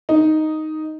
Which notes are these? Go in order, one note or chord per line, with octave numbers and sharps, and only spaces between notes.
D#4